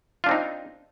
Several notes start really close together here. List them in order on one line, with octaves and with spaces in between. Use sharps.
F4 D4 C4 D#4